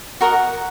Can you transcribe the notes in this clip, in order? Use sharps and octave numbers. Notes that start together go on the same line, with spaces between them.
F#4 A#4 D#5 F#5